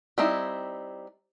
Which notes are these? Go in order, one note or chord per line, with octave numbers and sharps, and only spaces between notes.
G3 C4 D#4 E4